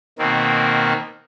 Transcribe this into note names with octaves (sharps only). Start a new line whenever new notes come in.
B2 D#3 A#3 C4